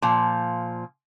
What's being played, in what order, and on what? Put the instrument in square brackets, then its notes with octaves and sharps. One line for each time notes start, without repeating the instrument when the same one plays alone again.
[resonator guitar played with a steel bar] A#2 F3